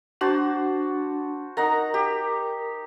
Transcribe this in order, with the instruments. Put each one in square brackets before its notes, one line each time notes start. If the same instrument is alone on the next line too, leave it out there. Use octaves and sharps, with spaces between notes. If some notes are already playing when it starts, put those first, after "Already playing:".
[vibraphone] D4 [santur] F#4 C5 A5
[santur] D#4 F#5 A#5 [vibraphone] A#4
[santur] G4